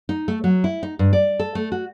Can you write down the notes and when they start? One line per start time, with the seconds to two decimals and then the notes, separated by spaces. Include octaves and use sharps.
0.09 D#4
0.28 A3
0.44 F#3
0.64 E4
0.83 D#4
0.99 G2
1.13 D5
1.39 A4
1.55 A3
1.72 F#4